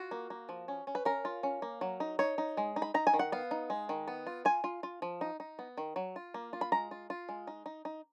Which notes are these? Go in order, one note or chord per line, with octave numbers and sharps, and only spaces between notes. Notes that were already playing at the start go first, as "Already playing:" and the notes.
Already playing: F4 F#4
A#3
A#3
F3
C#4
C#4
B4
C#4 A#4
F4
C#4
A#3
F#3
D#4
D#4 C#5
D#4
G#3
D#4
B5
D#4 A#5
G#5
D#3
F#5
B3 F5
D#4
G#3
D#3
B3
F4
F4 G#5
F4
F4
F3
D#4
D#4
B3
D#3
F#3
F4
A#3
F4
B5
G#3 A#5
F4
F4
G#3
D#4
D#4
D#4